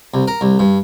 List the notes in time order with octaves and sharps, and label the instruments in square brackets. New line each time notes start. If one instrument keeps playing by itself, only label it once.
[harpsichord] C2
A#4
C2
G2